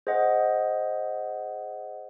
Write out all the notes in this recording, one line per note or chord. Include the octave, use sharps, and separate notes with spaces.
G#4 C5 D#5 F#5